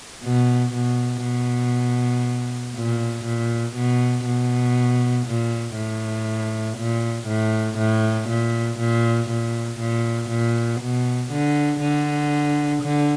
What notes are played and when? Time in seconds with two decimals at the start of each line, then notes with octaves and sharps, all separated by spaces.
0.23 B2
0.74 B2
1.24 B2
2.75 A#2
3.25 A#2
3.76 B2
4.26 B2
5.27 A#2
5.77 A2
6.78 A#2
7.28 A2
7.78 A2
8.29 A#2
8.79 A#2
9.30 A#2
9.80 A#2
10.30 A#2
10.81 B2
11.32 D3
11.81 D3
12.83 D3